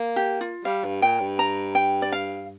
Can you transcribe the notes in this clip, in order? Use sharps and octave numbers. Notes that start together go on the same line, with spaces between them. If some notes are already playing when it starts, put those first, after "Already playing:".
Already playing: A#3
G4
F4
G3 F5
G2
A#2 G5
G2
A#5
G5
D5
F5